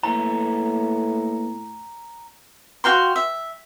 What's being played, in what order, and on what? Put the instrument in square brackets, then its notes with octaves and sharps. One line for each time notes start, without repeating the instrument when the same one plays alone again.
[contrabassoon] A2 [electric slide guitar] A#3 B3 A4 [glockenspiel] A#5
[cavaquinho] F#4 F5 G5 C6
E5